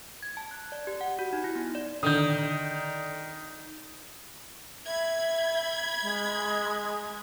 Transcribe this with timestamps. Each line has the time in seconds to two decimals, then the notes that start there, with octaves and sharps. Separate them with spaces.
0.23 G#6
0.37 A5
0.51 F#6
0.72 D5
0.87 G4
1.01 F#5
1.19 F#4
1.33 D#4
1.44 E4
1.56 B3
1.75 D5
2.03 D3 D#3 D#6 G6
4.86 E5 B5 G#6
6.02 G#3